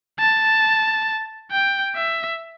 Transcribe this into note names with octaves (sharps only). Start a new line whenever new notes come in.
A5
G5
E5